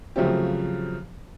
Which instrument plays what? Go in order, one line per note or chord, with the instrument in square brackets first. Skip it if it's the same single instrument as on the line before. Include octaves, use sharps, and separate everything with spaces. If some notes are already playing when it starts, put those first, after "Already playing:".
[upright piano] C#3 F3 F#3 A3 C4 G4